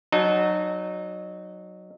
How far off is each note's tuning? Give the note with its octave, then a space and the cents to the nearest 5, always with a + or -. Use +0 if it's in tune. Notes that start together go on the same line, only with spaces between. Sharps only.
F#3 +0 D#4 -25 A5 -10